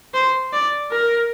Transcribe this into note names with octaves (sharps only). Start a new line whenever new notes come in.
C5
D5
A#4